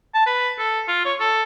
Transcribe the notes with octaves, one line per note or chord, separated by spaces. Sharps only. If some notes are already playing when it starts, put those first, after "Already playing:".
A5
B4
A4
F4
C#5
A4